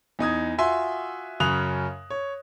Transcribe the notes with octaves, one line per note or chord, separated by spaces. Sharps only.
E2 D#4 D#6 G#6
F4 F#4 E5 G#5 C6
F#2 C#3 D#6 F#6 F7
C#5